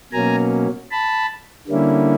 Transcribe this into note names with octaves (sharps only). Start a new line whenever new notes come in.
B2 F#3 A#3 C#4 G#5 A#5
A5 B5
D3 G3 A#3 C#4 E4